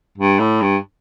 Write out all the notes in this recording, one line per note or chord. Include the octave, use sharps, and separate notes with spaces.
G2
A2
G2